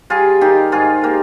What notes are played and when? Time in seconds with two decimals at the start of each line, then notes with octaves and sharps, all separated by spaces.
0.10 G3 F4 G#4
0.41 D#3 D#4 G4
0.72 G#2 F4 G#4
1.03 A#3 G4 A#4